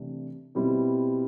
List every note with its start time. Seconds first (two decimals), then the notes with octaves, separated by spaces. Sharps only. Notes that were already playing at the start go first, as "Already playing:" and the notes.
Already playing: C3 E3 A3 D4
0.55 B2 G3 C4 E4 G4